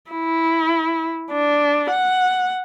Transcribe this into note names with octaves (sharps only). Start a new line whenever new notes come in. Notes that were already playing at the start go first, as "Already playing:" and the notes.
E4
D4
F#5